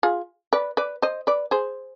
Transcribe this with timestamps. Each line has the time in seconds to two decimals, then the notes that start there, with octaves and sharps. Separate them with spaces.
0.03 F4 G#4
0.53 B4 D5
0.77 B4 D5
1.02 C5 D#5
1.27 B4 D5
1.51 G#4 C5